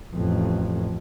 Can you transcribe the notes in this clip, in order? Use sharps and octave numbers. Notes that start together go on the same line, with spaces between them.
A1 F2